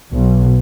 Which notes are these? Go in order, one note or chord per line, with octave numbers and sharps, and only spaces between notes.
B1